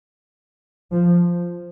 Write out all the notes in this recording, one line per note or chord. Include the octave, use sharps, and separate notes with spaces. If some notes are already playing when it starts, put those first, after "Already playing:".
F3